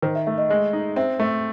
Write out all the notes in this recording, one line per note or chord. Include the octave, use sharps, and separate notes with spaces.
D#3 C5
E5
A3 E5
D#5
G#3 D#5
D#4
C4 E5
A3